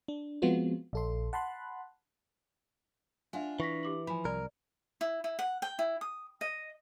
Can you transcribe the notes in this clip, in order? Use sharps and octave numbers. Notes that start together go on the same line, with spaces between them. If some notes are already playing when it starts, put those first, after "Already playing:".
D4
F3 G#3 B3 C4 F4 F#4
A#1 A4 C6
F#5 A5 B5 C6 F#6
D4 F4 E5 F#5 G#5
E3 C#6 A#6 B6
G4 D6 F#7
F3 G#5 B5
C2 A#4 D5
E4
E4
F#5
G5
E4
D#6
D#5